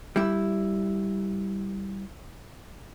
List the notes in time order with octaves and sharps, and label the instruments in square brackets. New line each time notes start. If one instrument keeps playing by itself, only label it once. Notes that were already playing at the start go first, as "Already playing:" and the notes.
[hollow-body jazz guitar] G3 E4